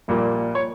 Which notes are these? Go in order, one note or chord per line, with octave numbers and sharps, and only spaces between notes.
A#1 A#2 G3 A#3
C#5